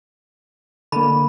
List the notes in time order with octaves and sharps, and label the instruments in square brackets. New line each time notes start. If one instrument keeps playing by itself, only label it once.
[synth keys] D3 A#3 [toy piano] B5